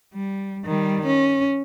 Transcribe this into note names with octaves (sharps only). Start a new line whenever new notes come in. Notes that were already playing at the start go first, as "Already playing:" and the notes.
G3
D#3 G3
C#4